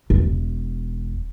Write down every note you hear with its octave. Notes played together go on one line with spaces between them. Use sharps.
E1